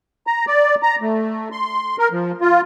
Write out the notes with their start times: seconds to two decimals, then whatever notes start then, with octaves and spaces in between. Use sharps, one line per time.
0.27 A#5
0.47 D5
0.83 A#5
1.01 A3
1.52 C6
1.99 A#4
2.12 F3
2.41 F4